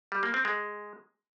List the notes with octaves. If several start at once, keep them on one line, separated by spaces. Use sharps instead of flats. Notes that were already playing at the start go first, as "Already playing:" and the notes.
G3
A#3
C4
G#3